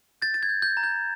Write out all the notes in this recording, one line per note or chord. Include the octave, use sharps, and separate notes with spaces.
G6 A6
A6
G#6
G6
G6
A#5
G6